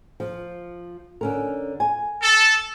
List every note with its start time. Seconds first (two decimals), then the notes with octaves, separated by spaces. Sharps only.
0.20 F3
1.21 D3 C#4 A#4
1.80 G#5
2.22 A4